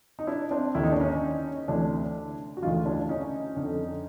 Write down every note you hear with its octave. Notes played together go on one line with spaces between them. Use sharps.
D#4
D4 E4
C4 D4
D#2 D3 E4
D#4
D4
C#4 D#4
D2 C3 E3 D4 E4
F#4
D2 C#3 E3 D#4 F4
D4 E4
C#4 D#4
F2 D3